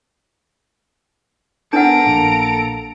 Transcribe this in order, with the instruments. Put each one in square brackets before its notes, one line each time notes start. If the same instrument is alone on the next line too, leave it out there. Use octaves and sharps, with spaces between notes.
[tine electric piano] B3 A#4 [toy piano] D4 F#5 [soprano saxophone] A4 [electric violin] A#5 D7
[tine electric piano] A#1 A#3